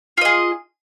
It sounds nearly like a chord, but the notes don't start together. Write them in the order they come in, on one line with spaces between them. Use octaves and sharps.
F4 D#5 G#4